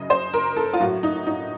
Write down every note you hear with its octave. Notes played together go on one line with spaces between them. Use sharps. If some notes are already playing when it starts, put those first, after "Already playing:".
Already playing: F#2 C#3 D#5
C5
A#4
A4
F4
A2 F#3 F#4
D#4
D#4